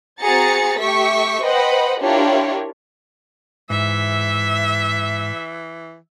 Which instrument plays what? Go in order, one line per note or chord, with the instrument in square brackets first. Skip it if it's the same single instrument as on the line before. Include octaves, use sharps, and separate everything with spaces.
[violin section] C4 F#4 G#4 A#5 A6 C#7
A3 G4 E5 C#6 B6
B4 C5 D#5 F#5 G5 B5
D4 E4 F4 G4 A#4 C#5
[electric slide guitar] G#2 [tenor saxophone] E3 [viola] E5